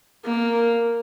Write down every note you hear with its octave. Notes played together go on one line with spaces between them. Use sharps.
A#3